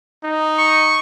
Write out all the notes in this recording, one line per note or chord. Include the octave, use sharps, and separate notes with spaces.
D#4
C#6